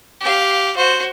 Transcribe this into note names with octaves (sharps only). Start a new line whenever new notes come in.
G4 F5
F#4 C5